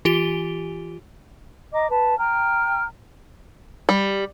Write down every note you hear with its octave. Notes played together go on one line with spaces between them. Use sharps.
E3 F4 G4 D7 G7
D#5 A#5 D6
B4 A5
G5 A#5 F6
G3